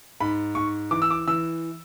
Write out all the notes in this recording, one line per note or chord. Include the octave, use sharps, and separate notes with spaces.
G#2 B5
G#2 C#6
E3 D6
E6
D6
E3 E6